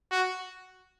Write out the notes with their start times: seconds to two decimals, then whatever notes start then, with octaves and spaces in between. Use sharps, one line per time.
0.11 F#4